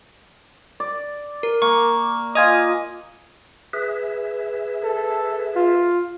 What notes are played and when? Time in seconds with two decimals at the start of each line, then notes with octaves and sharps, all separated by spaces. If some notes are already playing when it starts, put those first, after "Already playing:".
0.80 D5
1.43 A#4
1.62 A#3 C#6
2.35 F4 D#5 G#5 D#6
3.73 G#4 B4 E5
4.83 A4
5.56 F4